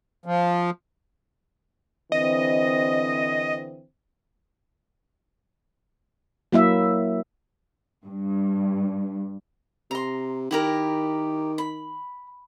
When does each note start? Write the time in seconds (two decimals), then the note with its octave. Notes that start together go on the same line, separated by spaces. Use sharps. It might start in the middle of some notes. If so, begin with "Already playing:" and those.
0.26 F3
2.12 D3 E3 C4 D#5
6.52 F#3 A#3 E4 E5
8.06 G2
9.91 C3 A#5 C6
10.51 D#3 E4 G4 A#4
11.58 B5